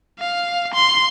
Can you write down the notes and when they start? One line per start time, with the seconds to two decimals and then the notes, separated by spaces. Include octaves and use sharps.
0.20 F5
0.75 C6